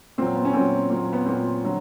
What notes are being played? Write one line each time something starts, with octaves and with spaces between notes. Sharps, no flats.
A#2 F#3 C4
B3
C#4
A#2 F#3 C4
A#2 F#3
B3
A#2 F#3 C4
D3 F#3